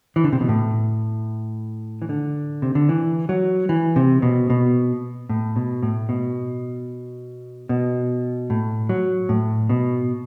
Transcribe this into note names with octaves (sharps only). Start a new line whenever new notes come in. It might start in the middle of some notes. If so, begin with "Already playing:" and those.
E3
D3
C3
B2
A2
E3
D3
C3
D3
E3
F#3
E3
C3
B2
B2
A2
B2
A2
B2
B2
A2
F#3
A2
B2